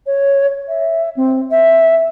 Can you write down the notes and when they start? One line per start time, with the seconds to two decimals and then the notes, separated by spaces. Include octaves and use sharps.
0.06 C#5
0.68 E5
1.16 C4
1.51 E5